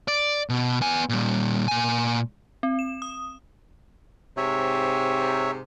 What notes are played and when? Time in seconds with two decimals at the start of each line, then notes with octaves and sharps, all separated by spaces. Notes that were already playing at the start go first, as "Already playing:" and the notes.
0.08 D5
0.49 B2
0.81 B3 G#5
1.09 A#2 G3
1.68 A#2 G#5
2.63 C4
2.79 E7
3.02 D#6
4.37 G#2 C3 C#5 E5